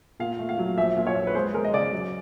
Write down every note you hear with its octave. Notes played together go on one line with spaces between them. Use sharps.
A#2 F5
A3
F5
F#3
A#1 E5
A#2
C#5
A#1
B4
G#3 C5
G#3 A#4
D#5
C#3 D5
F#3